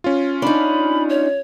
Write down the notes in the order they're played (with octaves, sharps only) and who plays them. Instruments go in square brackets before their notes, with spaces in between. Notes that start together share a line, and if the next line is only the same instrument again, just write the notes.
[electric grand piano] C#4 F4
[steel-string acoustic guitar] D4 D#4 [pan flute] B5
[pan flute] C#5